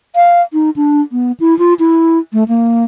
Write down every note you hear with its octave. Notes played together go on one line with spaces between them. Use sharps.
F5
D#4
D4
B3
E4
F4
E4
A3
A#3